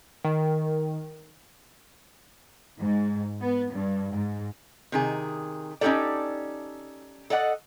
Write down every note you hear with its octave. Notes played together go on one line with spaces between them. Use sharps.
D#3
G#2
B3
G2
G#2
C3 D#3 G#4
C#4 D#4 F#4 G4 A4 D5
A4 D5 D#5 F#5